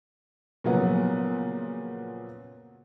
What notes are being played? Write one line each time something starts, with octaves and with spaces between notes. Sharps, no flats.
A#2 C#3 F3 F#3 B3